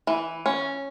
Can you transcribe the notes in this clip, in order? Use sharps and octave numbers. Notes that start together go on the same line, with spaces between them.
E3
C#4